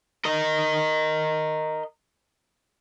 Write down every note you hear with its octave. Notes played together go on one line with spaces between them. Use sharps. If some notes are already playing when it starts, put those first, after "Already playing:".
A#4 D#5